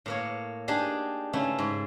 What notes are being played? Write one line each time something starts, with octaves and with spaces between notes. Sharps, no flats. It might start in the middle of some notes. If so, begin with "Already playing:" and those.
A2 A#3 C#5
D4 D#4 G4 G#4
C#3 A3 C#4 D#4 E4
G#2